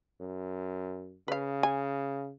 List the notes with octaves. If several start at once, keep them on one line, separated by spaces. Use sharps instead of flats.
F#2
C#3 B4 F5
G#5